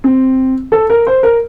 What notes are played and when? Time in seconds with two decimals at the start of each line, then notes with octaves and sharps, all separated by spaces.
0.04 C4
0.72 A4
0.90 A#4
1.07 C5
1.23 A#4